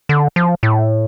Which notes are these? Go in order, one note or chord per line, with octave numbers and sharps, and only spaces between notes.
D3
F3
A2